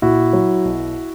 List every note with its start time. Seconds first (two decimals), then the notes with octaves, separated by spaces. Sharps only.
0.02 A#2 E4 F#4
0.33 F#3
0.65 B1